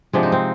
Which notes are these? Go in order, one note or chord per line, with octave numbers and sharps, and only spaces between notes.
C3 F3 G#3 D4
D#4
C4